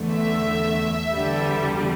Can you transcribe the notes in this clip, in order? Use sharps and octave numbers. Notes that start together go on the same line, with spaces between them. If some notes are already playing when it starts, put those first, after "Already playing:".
Already playing: E2 D3 A3
E5
E2 D3 G3